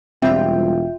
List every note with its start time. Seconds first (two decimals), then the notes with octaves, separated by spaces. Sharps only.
0.22 E1 G3 C4 F4 E5 G5